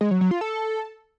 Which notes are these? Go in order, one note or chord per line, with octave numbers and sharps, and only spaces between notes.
G#3
F#3
F#3
F4
A4